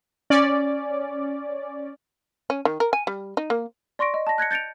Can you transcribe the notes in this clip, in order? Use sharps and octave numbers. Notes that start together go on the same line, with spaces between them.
C#4 D5
C#4
D#3
A#4
G#5
G3
D#4
A#3
D5 C6 C#6 A#6 D7
D#5
A5 A#6
F#6 G#6 A#6 C#7
G6 A6 C#7 D7 F7